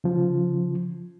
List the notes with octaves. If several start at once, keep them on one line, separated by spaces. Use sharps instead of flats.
C#3 F3